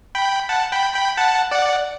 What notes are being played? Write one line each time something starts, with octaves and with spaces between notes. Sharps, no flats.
G5 B5
F#5 A5
G5 B5
G5 B5
F#5 A5
D5 F#5